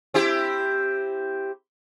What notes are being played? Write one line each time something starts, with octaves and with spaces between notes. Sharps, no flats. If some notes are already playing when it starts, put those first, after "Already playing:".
C4 E4 G4